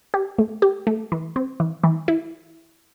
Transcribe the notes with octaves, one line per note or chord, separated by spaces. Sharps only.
G4
A3
G4
A3
E3
C4
E3
E3
E4